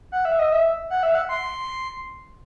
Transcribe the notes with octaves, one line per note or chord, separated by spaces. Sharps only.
F#5
E5
D#5
E5
F#5
E5
F#5
C6